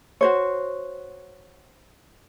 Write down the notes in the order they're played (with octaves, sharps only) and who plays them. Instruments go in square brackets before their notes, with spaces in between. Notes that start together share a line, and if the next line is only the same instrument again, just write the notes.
[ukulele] F#4 C5 C#5